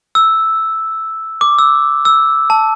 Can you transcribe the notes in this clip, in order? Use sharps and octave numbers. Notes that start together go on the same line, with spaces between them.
E6
D6
E6
E6
A5